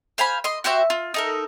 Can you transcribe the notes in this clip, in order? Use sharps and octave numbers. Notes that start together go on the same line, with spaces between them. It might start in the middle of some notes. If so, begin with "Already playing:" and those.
C5 F5 G#5 B5
D#5 C6
F#4 G4 C5 E5
F4
D#4 A4 A#4